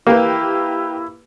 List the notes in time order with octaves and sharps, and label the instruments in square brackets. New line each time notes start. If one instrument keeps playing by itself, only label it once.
[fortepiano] A#3 [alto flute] E4 [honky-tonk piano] G4 B4